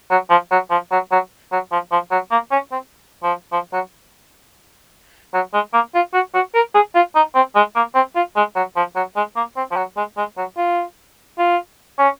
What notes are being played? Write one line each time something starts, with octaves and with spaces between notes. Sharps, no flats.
F#3
F3
F#3
F3
F#3
F#3
F#3
F3
F3
F#3
A#3
C#4
C4
F3
F3
F#3
F#3
G#3
A#3
F4
F#4
F#4
A#4
G#4
F4
D#4
C4
G#3
A#3
C4
F4
G#3
F#3
F3
F#3
G#3
A#3
C4
F3
F#3
G#3
G#3
F#3
F4
F4
C#4